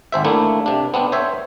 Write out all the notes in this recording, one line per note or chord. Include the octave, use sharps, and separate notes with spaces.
G#1 C5 E5
A3 A#3 D4 E4
C3 D4
B3 C4 D4
C5 C#5 E5